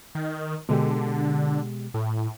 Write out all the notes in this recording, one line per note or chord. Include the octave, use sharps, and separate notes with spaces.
D#3
B2 D3 G#3 G4
A2